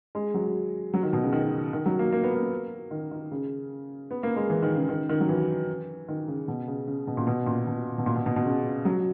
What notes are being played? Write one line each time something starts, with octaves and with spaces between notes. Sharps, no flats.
G#3
F#3
F#3
D#3
B2
C#3
D#3
D#3
F#3
A#3
A#3
B3
A#3
D#3
D#3
C#3
B3
A#3
G#3
E3
D#3
C#3
D#3
D#3
F#3
E3
D#3
C#3
B2
C#3
C#3
B2
A#2
B2
A#2
B2
B2
A#2
B2
B2
B2
C#3
F#3